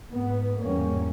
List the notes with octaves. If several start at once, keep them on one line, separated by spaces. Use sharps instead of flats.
G#2 B3
E2 G#2 G3 A#3 C#4